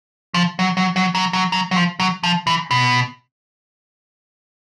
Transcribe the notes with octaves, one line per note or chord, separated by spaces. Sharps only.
F3
F#3
F#3
F#3
F#3
F#3
F#3
F#3
F3
F#3
F3
E3
B2